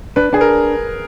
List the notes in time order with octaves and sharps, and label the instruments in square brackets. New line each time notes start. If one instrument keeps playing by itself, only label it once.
[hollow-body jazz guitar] D4 [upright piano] B4
[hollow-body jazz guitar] D4 [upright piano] G#4
[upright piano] A#4